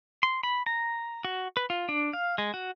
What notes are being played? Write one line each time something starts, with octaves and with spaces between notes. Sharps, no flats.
C6
B5
A#5
F#4
B4
F4
D4
F5
G#3
F#4